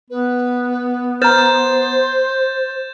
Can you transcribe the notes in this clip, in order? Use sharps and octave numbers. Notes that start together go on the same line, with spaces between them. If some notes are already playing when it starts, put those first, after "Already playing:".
B3 B4
B4 C5 A#5 G6 A6 E7